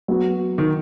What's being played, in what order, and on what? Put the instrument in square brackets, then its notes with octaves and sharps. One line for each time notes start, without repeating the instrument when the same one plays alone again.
[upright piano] F#3 B3 F#4
[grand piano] D#3